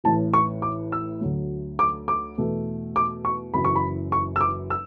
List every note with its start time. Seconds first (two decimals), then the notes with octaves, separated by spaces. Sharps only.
0.04 A1 A2 E3 A5
0.34 C#6
0.62 D6
0.92 E6
1.21 D2 D3 F#3 A3
1.79 D6
2.08 D6
2.38 E2 B2 A3
2.96 D6
3.25 C#6
3.54 F#1 F#2 E3 B5
3.65 C#6
3.76 B5
4.12 C#6
4.36 E6
4.41 D6
4.70 E6